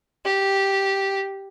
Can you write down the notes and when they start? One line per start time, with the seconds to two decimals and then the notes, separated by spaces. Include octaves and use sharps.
0.25 G4